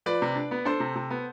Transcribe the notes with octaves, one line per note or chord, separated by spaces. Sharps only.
F3 B4 D5
C3
D4
B3
D4 A4 C5
C3
C3
B3